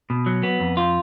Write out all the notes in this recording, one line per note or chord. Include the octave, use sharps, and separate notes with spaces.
B2
F#3
B3
F2
F4